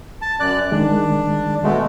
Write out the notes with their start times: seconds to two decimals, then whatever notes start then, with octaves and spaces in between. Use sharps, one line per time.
0.22 A5
0.40 F#2 D5 F#6
0.72 D#3 G#3 D4
1.64 B2 G#3 A3